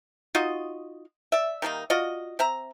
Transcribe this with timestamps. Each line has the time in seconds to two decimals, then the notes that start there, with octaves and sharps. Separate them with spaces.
0.35 D#4 F4 F#4 D#5
1.32 D5 E5
1.62 D#3 G3 A#3 D#4
1.90 F4 F#4 D5 D#5
2.39 C4 E5 A#5